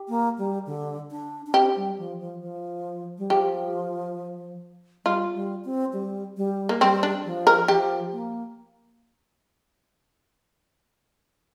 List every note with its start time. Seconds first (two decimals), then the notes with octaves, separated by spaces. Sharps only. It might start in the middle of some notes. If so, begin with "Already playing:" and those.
Already playing: G4
0.09 A#3
0.38 G3
0.66 D3
1.11 D4
1.46 D4
1.54 C4 G4
1.76 G3
1.98 F3
2.20 F3
2.42 F3
3.18 G3
3.30 F3 G4
5.05 G3 F4
5.35 G3
5.64 C4
5.93 G3
6.37 G3
6.69 A#3
6.81 G3 C4
7.03 D4
7.25 F3
7.47 A#4
7.68 F3 G4
8.12 A#3